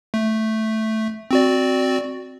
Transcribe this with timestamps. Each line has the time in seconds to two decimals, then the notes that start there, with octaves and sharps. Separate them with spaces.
0.14 A3
1.31 C4 F#4 D5